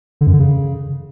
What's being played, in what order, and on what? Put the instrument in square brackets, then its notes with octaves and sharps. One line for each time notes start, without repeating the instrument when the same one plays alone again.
[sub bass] D3
F#2
D3
C#3